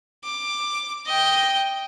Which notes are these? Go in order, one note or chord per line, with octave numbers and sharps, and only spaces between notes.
D6
D#5 G5